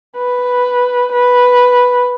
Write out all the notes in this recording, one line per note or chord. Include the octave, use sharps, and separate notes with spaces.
B4
B4